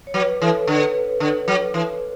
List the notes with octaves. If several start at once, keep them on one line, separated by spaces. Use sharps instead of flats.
C#5
F#3 B4
E3 A4
D3 B4
D3
F#3
E3